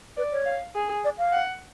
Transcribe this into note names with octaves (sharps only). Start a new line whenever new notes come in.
B4 D5
C#5
F5
G#4
D5
F5
F#5